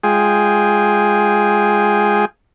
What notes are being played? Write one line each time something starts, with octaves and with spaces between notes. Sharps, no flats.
G#3 F4 G#4 G5 G#5